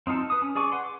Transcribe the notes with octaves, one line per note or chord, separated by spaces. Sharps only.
C4 D#4 F4 A4
B4 D#6
C#4
G#4 D5 G#5 C#6 D6
B4 F#5 C6
D6